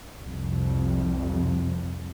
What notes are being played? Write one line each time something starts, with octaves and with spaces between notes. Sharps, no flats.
C2 F2